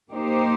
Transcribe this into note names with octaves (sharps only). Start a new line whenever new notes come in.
A#3 D#4 G4 C5